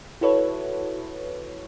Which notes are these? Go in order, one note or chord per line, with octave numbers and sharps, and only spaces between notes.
E4 F#4 A4 B4 C#5